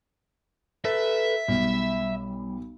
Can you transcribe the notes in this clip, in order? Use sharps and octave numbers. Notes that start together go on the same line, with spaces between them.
A4 B4 E5
B1 G3